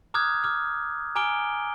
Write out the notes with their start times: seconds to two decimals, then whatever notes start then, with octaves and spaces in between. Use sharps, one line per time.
0.14 A#5 D6 D#6 F6 F#6 G#6
0.43 D6 F6 G#6
1.15 G#5 A#5 D6 F6 D7 G7